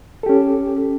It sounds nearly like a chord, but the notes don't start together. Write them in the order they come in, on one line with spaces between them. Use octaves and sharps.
A4 G4 C#4